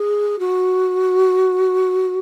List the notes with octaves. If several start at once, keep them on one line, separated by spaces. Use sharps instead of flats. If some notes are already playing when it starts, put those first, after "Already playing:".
Already playing: G#4
F#4